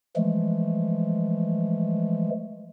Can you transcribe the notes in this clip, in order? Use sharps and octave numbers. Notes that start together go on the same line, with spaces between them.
E3 F3 G#3 A3